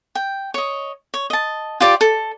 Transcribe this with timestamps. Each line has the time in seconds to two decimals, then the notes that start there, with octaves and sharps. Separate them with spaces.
0.15 G5
0.54 C#5 D#5
1.14 C#5
1.30 D#5 A5
1.80 F4 G4 D5
2.01 A4